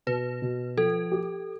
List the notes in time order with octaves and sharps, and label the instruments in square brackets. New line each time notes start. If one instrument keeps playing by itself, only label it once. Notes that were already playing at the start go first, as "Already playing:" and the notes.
[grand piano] B2 [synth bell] B4
[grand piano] B2
[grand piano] F3 [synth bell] A4
[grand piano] G4